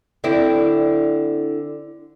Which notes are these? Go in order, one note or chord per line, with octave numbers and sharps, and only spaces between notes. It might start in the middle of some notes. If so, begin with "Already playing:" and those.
D3 C4 E4